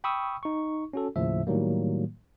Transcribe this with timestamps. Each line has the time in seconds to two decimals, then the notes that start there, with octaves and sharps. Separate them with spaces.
0.04 G5 B5 C#6 D#6 E6
0.43 D#4 C#6
0.93 C#4 F#4 A4
1.16 D#2 A2 C#3 F3 E5
1.47 A2 D#3 F#3 G3 A#3